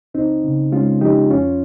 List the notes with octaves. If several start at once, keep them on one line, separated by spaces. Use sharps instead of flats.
C#2 C4 D#4
C#3
G#3 C#4 F4
F3 D#4 G4
F2 C#4 F4